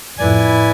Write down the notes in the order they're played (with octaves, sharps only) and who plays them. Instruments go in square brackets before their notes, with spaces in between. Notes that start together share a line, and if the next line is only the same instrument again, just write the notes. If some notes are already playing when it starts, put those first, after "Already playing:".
[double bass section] F2 A2 [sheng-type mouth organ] E4 B4 D5 G#5